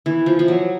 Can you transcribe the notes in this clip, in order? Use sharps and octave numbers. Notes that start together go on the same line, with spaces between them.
E3
F3
F3
F#3